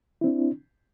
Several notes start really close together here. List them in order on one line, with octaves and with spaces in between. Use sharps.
E4 C4 D4